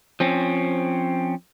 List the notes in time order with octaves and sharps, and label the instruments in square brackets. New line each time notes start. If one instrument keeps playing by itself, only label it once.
[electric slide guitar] F3 C4 C#4